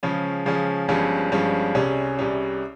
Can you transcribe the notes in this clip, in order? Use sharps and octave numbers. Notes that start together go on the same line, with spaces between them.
C#3 F3 G#3 C#4
C#3 F3 G#3 C#4
G1 G2 F3 G#3 C#4
G1 G2 F3 G#3 C#4
C2 C3 G3 C#4 G#4
C2 C3 G3 C#4 G#4